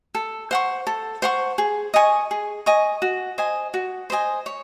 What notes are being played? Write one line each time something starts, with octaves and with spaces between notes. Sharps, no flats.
A4
C5 F#5 C#6
A4
C5 F#5 C#6
G#4
D#5 G#5 C#6
G#4
D#5 G#5 C#6
F#4
C5 D#5 G#5
F#4
C5 D#5 G#5
C#5